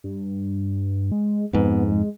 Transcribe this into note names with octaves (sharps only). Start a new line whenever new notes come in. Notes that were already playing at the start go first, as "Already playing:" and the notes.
G2
G#3
F2 G#2 B3
G#3